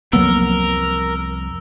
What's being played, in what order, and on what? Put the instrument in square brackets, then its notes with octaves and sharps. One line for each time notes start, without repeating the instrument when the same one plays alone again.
[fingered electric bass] C2 F2 [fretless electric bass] F#3 A#3 B3 [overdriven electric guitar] A#4 [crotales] E6